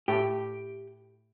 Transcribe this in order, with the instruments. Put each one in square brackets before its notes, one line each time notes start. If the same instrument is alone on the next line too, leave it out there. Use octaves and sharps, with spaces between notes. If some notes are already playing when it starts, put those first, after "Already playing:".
[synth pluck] A2 A3 [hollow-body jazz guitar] G4